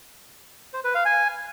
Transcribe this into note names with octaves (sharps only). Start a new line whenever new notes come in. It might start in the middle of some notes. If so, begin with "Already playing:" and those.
C5
B4
F5
G#5